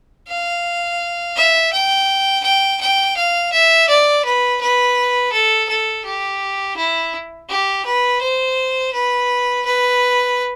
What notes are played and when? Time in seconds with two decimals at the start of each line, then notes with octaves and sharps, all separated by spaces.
0.28 F5
1.37 E5
1.73 G5
2.44 G5
2.81 G5
3.17 F5
3.53 E5
3.89 D5
4.25 B4
4.61 B4
5.33 A4
5.69 A4
6.05 G4
6.77 E4
7.50 G4
7.86 B4
8.22 C5
8.94 B4
9.66 B4